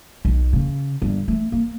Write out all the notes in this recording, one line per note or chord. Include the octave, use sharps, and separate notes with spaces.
B1
C#3
G1
A3
A#3